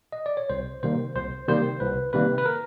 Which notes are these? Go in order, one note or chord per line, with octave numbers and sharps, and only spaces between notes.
D#5
D5
C#5
C2 C5
C3 D#3 G3 A#3 C5
C2 C5
C3 D#3 G3 A#3 C5
C2 B4
C3 D#3 G3 A#3 B4
B4
A#4